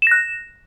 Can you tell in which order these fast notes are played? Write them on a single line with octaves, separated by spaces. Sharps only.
E7 A#6 F#6